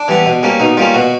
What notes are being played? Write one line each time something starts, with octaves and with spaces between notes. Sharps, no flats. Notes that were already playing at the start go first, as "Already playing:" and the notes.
Already playing: D4
E3 G3 B3
B2
G3 A#3 C#4
B2 D#4
G3 A#3 C#4 F4
B2 F#4